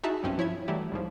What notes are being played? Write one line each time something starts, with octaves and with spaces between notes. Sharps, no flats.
D#4 E4 F#4 G#4 E5 A5
B1 G2 C4 C#4
F3 E4 C#5 E5 G#6
E3 F#3 G3 A3 E4 G4
C2 G#2 F3